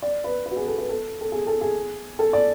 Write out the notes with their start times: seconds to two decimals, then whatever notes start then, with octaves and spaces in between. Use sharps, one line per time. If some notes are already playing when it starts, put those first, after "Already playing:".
0.02 D5
0.24 B4
0.46 B4
0.51 F#4
0.57 G#4
0.67 A4
0.78 B4
0.89 A4
1.21 A4
1.32 G#4
1.47 A4
1.61 G#4
2.19 A4
2.33 D5